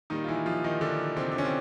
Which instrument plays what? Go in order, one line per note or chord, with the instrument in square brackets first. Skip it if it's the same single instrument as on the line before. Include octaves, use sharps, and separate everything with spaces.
[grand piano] A#2 D#3 G3 D#4
F4
E3 E4
F3 F4
D#3 D#4
D3 D4
C3 C4
D4
C#4
C4